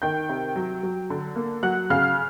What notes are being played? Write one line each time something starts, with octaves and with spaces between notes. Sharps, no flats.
D#3 G5 G6
C3
F#3
F#3
D3
A#3
F#3 F#5 F#6
C#3 F5 F6